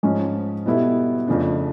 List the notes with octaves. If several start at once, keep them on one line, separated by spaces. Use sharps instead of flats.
G#2 F3 G#3 C#4
B2 G3 B3 E4 A4
F2 C#3 F3 A3 D4